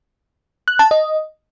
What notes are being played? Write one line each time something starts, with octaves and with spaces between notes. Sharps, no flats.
F#6
A5
D#5